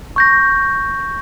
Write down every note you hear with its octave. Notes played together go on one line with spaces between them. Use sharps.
C#6 G6 A#6